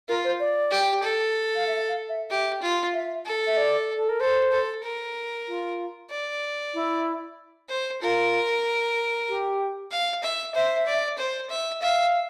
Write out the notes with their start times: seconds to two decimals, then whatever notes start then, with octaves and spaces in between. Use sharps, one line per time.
0.09 F4 A#4
0.24 C5
0.40 D5
0.71 G4
1.03 A4
1.55 F5
1.67 E5
1.88 F5
2.09 E5
2.30 G4 E5
2.62 F4
2.94 E5
3.26 A4
3.47 E5
3.57 D5
3.96 A4
4.09 A#4
4.20 A4 C5
4.52 A4
4.83 A#4
5.48 F4
6.10 D5
6.74 E4
7.69 C5
8.02 F4 A#4
9.29 G4
9.91 F5
10.23 E5
10.55 C5 E5
10.86 D5
11.18 C5
11.50 E5
11.82 E5 F5